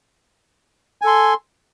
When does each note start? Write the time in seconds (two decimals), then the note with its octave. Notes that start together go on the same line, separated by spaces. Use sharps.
1.02 G#5
1.04 A4
1.07 C6